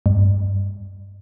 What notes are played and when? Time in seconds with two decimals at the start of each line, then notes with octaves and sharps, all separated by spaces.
0.06 G2